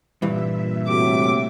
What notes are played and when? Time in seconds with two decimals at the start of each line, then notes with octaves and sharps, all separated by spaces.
0.22 G2 A#2 E3 E5
0.88 A2 C3 F#4 D6